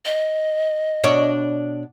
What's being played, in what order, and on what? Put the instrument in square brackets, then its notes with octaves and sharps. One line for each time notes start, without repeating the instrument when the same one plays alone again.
[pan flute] D#5
[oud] B2 D4 C#5